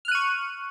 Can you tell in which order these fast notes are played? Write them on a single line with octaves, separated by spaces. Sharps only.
F6 F#6 D#7 C#6